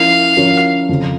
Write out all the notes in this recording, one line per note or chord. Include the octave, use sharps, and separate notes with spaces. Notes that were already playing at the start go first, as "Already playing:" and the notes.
Already playing: F3 C#4 E4 A#4 F5
F3 C#4 E4 A#4
F2 C#3 F3